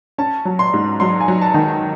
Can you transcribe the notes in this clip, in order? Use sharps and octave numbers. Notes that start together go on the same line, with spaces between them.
C#4 A5
F#3
C6
G#2
F#3 C6
G#5
F#3
A5
D#3